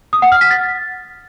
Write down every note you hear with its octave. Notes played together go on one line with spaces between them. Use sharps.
D#6
F#5
F6
B6
A6